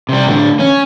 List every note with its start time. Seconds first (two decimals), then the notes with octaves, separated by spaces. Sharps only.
0.09 C3 G3
0.28 A2 D3
0.59 C#4